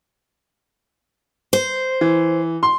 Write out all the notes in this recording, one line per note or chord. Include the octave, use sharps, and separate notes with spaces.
C5
E3
C6